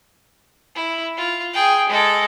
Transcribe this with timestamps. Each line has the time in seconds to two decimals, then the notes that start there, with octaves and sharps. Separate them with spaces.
0.76 E4
1.17 F4
1.53 G#4 G5
1.90 G#3 A4